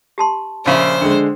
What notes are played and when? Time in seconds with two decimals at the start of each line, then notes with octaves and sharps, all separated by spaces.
0.18 G4 A5 C6
0.66 A#1 C#3 C5 E5
1.01 D3 G#3 G5